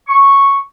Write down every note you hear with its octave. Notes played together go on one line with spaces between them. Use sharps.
C#6